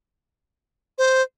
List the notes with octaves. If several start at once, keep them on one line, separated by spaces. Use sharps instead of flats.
C5